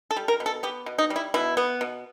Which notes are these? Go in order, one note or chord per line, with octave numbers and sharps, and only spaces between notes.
A4
G3
A#4
B2
A4
B3 G4
B2
D#4
G3
E4
B2 E4
B3
B2